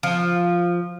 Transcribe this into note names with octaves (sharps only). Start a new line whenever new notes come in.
F3